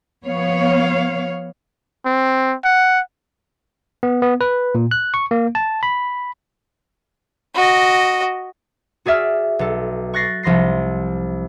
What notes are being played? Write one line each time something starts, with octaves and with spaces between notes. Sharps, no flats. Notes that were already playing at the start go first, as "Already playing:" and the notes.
F3 B3 C#5 F5
C4
F#5
B3
B3
B4
A#2
F#6
C#6
A#3
A5
B5
F#4 D#5
F#4 G#4 D5 E5 F6
B1 A4
C#6 F#6 A6 A#6 C7
C2 F3 C6 A#6 C7